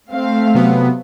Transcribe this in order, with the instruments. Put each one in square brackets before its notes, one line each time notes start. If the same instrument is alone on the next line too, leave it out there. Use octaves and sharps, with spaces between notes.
[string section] A3 C4 F5
[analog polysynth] C3 F#3 B3